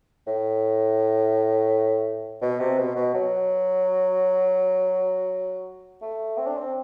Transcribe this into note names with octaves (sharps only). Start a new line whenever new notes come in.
A2
B2
C3
B2
B2
F#3
A3
C4
D4
C4